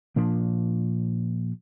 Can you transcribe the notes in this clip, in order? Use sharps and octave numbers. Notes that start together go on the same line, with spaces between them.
A#2 F3 A#3 D4